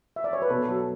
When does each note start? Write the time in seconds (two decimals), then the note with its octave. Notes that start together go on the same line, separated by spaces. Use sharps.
0.16 E5
0.24 D5
0.33 C#5
0.42 B4
0.50 B2 A4
0.68 F#3 A4